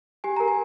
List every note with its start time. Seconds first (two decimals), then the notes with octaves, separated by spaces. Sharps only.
0.24 G4 G#5
0.36 A#4 A#5
0.48 G#5